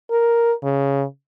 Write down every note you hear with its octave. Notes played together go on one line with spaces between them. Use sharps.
A#4
C#3